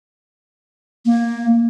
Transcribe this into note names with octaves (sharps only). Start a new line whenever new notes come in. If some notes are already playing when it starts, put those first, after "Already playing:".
A#3